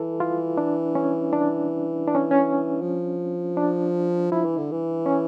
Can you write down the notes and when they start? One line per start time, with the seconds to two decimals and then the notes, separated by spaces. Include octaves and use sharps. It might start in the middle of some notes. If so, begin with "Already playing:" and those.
Already playing: E3 A4
0.20 F4
0.58 D4
0.95 C#4
1.33 D4
2.08 D4
2.15 C#4
2.31 C#4
2.82 F3
3.57 D4
4.32 F3 E4
4.45 E3
4.58 D3
4.72 E3
5.06 C#4